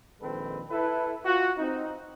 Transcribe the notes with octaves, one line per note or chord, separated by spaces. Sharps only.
A#1 D#3 G#3 C4 A4 B4
E4 A4 B4
F4 F#4
C4 D#4